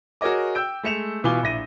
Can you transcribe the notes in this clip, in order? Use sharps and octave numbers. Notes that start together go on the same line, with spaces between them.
F#4 G#4 A#4 C#5 D#5 D6
G5 E6 G6 D7
G#3 A3 C#7 E7 F7
B2 E3 F4 G#5 D6 G7
A#1 E4 A#6 D#7